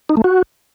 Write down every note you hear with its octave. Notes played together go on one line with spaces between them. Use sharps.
D#4
A3
F#4